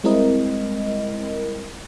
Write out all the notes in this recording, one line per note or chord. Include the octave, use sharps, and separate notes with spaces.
G3 G#3 C4 E4 A#4 D#5